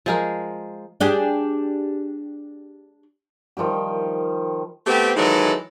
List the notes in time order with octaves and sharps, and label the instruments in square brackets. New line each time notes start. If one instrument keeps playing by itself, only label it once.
[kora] F3 G#3 A#4
[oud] D4 G4 G#4
[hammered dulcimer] D#3 F3 G3 G4
[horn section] A3 B3 C4 G4
D#3 E3 F#3 G#3 A4